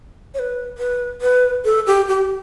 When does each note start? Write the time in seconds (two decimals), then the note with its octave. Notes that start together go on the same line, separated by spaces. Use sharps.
0.34 C#5
0.39 B4
0.78 B4
1.22 B4
1.65 A4
1.87 G4
2.08 G4